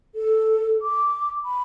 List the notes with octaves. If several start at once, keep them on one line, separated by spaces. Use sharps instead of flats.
A4
D6
B5